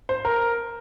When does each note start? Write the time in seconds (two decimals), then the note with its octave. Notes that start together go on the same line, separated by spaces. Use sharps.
0.09 C5
0.25 A#4